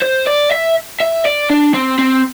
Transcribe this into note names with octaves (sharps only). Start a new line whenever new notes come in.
C5
D5
E5
E5
D5
D4
C4
C4